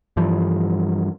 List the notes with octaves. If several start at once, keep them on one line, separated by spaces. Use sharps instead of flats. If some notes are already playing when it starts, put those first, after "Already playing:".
G2 E3 F3 G3